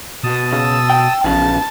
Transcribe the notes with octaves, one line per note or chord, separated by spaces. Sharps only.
B2 A5 D#6
C#3 E6
G5
A#1 E2 C#3 A5